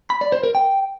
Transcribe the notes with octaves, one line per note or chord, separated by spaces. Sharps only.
B5
D5
C5
A#4
G5